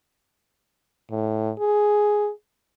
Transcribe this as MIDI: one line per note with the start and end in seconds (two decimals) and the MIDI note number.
1.11 1.52 45
1.59 2.30 68